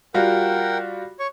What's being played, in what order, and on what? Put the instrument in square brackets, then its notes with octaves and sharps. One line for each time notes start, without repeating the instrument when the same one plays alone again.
[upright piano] G3 F4 F#4 [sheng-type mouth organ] A#4 F#5 G5
[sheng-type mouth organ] C#5 C#6